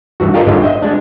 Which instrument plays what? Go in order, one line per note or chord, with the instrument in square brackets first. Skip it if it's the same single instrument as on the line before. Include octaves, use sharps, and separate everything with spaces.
[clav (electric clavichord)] G2 E3 F#4
F4 G4 A4 A#4 D5 D#5
G1 G#2 D3 G#3 F4 C#5
D#5 E5 G5
G#3 D4